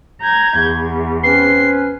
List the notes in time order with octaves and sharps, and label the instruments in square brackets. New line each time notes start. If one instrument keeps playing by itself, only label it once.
[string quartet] A#5 G6 G#6
E2
[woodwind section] C4 C#4 B4 [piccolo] C7